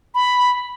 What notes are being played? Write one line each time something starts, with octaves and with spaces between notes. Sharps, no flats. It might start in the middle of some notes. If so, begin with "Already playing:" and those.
B5